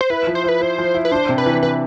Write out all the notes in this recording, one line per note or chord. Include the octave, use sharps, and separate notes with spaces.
C5
E4 B4
F3
C5
E4 B4
E4 C5
F3
E4
B4
D4 C5
C3
B4
E3
E3 B4